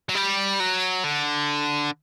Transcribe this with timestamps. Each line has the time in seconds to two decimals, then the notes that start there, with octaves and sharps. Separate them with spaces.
0.09 F#3
0.15 G3
0.60 F#3
1.04 D3